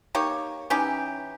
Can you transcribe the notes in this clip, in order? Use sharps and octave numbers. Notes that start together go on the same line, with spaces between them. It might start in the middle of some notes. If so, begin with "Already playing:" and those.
A#3 D#4 G4 C#5
E3 C#4 D#4 G4